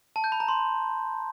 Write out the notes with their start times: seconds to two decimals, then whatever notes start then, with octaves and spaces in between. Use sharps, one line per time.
0.16 A5
0.24 G6
0.32 B5
0.40 A#5
0.48 C6